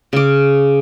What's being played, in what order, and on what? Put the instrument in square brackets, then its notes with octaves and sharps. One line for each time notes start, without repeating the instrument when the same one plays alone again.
[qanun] C#3 D6